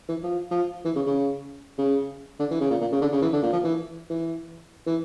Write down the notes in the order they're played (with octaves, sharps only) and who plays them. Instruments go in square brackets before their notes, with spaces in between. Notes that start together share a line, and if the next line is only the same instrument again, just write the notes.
[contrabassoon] E3
F3
F3
E3
C#3
C#3
C#3
D3
E3
C#3
A#2
A#2
C#3
D3
C#3
E3
D3
A#2
F3
E3
E3
E3